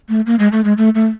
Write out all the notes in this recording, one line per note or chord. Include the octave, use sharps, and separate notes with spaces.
A3
A#3
G#3
A3
G#3
A3
A3